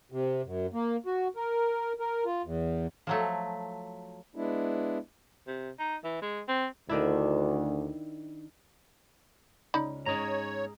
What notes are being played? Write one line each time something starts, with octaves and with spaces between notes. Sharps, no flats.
C3
F#2
A#3
F#4
A#4
A#4
F4
E2
F3 F#3 A3
G#3 B3 D4 E4
C3
D#4
E3
G#3
C4
D2 D#3 D4 E4
C#2 C#4 D#4 D5 B5
G#2 G#3 C#4 G#4 C#5 A#5